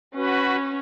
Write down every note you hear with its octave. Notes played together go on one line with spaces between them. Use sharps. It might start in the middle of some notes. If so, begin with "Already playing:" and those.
C#4 F#4 B4